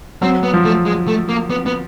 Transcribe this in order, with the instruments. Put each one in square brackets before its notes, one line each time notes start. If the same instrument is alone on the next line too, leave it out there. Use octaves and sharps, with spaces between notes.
[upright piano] F#3 [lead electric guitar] C4
[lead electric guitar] B3
[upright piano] F3
[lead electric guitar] A3
G#3
A3
A#3
B3
B3